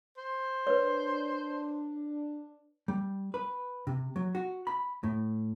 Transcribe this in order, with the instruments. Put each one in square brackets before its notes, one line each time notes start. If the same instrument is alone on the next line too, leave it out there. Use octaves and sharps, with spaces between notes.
[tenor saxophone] C5
[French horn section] D4 [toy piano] B4 C#5
[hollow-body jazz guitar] G3
B4
C3
F#3
F#4
B5
A2